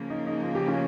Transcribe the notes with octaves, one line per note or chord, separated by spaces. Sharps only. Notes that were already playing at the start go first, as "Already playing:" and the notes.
Already playing: C#3 F3 A#3
D#4
D#4
F4
G4
C#4 F4